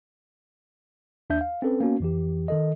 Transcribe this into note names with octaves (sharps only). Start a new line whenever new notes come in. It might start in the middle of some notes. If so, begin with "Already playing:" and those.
D#2 D4 E5 G6
F5
C4 C#4 A4 B4
A#3 B3 C#4 F#4
F2 E3 G4
D#3 A4 D#5